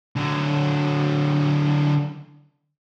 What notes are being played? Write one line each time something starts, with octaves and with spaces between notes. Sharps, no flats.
D3 F#3